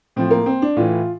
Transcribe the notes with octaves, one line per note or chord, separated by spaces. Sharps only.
A2 F3 C4
A#3
C4
D4
A2 E3 F4